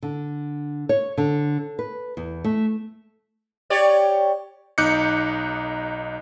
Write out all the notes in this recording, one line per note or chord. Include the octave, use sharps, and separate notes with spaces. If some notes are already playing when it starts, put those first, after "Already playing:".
D3
C#5
D3
B4
E2
A3
G4 C#5 D5
B1 D#4 D6 F#6 G6 C#7